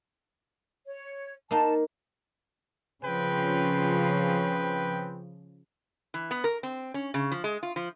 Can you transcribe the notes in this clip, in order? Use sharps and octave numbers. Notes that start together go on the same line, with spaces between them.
C#5
A#3 D#4 A5
C#3 F3 C4 B4 G5
E3
B3
A#4
C4
C#4
C#3
F3
G#3
F4
F3